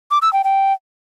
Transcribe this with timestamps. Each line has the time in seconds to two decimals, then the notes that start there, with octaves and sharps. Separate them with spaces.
0.11 D6
0.22 E6
0.33 G5
0.44 G5